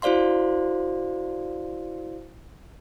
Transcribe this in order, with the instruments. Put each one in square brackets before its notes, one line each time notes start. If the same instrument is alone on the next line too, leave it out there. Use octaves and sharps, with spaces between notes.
[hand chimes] E4 F#4 C5 D5 F5 C6